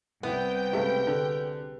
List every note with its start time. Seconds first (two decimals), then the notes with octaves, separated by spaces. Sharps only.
0.23 C2 B3 E4 G5
0.73 C#2 A3 G4 G#4 B4
1.07 D3